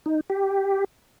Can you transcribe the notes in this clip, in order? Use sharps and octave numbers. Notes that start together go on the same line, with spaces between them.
D#4
G4